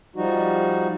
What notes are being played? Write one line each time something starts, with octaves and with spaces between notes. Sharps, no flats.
F3 G3 D#4 F#4